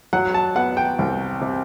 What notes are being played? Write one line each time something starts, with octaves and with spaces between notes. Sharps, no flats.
F#3 F#5
A5
B3 F#5
G5
C2
C3